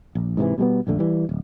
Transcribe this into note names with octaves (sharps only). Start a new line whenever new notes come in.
A#1
G#2 C3 D#3 E3
B2 G3 G#3 B3
A#1 F2 D3 A3
E3 G3
D1